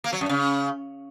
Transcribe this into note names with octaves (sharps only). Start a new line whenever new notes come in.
A#3
F#3
F#2
C#3